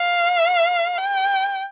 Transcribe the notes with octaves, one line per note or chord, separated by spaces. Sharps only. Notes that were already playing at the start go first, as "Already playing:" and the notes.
Already playing: F5
G5